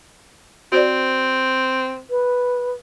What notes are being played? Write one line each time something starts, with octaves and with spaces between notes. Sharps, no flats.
C4 F#4 C5 D5
B4